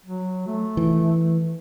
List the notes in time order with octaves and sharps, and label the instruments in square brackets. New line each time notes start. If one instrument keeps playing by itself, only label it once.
[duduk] F#3
A3
[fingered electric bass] E3